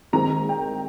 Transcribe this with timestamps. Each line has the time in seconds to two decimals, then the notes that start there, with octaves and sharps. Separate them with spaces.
0.13 D#3 G#3 C4 A#5
0.49 G5